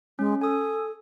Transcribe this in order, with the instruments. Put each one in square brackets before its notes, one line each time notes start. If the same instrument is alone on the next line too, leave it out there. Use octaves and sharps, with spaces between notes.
[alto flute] G#3 [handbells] C#4
[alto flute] A4 [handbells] G#5 D#6